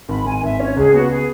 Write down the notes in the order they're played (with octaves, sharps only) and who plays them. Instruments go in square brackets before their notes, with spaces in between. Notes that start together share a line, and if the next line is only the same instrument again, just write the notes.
[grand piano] G#1 [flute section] B5
[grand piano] G#1 [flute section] G#5
[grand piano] G#1 [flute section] E5
[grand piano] C#4 [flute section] C#5
[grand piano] C#2 [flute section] G#4
[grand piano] B3 [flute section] F#4
[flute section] G#4